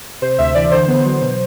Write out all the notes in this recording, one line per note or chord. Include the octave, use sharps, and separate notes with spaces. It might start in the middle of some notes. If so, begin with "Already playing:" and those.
C3 C5
D2 E5
E3 D5
D3 C5
B3
F#3
B2